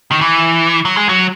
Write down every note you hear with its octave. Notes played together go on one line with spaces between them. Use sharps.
D#3
E3
F#3
G#3
F#3